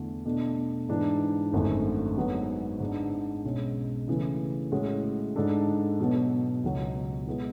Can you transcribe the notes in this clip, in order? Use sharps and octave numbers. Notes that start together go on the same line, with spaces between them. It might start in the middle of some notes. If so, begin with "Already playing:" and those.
Already playing: E2 D3 A3 D4
B2 A3 D4
G#2 E3 G#3 D4
G#1 F#2 D3 A3
G#2 F#3 B3
G#2 G#3 D4
B1 B2 G#3 C#4
C#3 E3 A3
A2 G#3 C#4 F#4
G#2 G#3 D4 A4
B2 F#3 B3
C#2 B2 F#3
B2 G#3 B3 E4